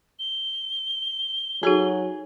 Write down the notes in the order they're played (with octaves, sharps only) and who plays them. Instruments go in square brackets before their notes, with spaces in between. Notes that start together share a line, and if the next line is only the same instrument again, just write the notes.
[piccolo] G7
[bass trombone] F#3 [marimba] D#4 F#4 A4 [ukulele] G#4